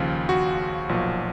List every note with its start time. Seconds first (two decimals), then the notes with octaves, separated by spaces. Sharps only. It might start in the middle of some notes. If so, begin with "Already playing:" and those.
Already playing: D#2 C#3 F3
0.29 F#4
0.89 B1 A#2 F3